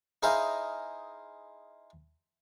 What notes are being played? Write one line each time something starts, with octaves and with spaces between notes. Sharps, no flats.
D#4 E4 G#4 C5 D#5 F5